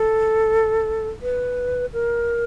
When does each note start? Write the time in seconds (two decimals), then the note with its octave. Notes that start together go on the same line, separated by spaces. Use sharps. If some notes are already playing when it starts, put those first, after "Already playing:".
Already playing: A4
1.22 B4
1.93 A#4